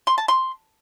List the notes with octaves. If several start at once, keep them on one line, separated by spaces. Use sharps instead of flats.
C6
A5
C6